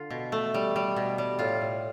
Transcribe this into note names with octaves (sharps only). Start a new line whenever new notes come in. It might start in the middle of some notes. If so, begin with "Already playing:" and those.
Already playing: D3 F4
B2
A3
G3
G3
B2
G3
A2 F4
A2